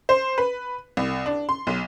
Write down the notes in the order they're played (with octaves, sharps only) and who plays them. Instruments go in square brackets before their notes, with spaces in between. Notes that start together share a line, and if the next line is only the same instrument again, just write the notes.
[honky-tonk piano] C5
B4
C2
D4
C6
B1